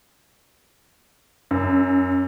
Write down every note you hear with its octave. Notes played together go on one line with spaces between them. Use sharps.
F#2